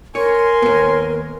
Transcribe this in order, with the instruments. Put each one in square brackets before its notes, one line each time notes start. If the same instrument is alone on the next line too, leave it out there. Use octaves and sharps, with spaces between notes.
[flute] A#4 [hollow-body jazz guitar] C#5 [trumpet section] G#5 C6
[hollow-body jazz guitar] D#2 B3